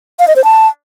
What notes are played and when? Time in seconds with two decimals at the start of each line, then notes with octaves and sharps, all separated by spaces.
0.19 F5
0.28 D#5
0.36 C5
0.44 A5